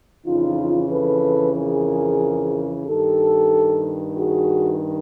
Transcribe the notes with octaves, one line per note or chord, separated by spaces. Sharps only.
F2 C#3 E3 D#4 F4
A4 B4
G#4 A#4
G2 D#3 G4 A4
F#4 G#4